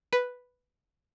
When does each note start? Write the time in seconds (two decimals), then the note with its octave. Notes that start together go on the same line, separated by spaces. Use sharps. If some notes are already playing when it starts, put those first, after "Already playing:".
0.13 B4